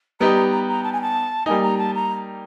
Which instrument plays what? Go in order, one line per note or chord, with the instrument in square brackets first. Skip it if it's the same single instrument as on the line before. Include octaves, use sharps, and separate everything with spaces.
[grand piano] G3 B3 D#4 G4 [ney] A#5
[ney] A#5
A#5
A#5
A5
G#5
A5
[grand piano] G3 A#3 D#4 [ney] G#5
[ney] A#5
A5
A#5